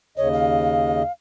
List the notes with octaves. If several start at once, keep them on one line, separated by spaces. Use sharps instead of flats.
D#2 C#3 C#5 D#5
F5